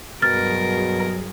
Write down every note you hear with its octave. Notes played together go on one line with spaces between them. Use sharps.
G2 B2 F#3 G#4 A#4 F6 A6